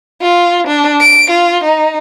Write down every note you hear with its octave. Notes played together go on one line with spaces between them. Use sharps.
F4
D4
D7
F4
D#4